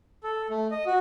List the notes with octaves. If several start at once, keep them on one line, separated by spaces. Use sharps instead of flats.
A4
A3
D#5
F#4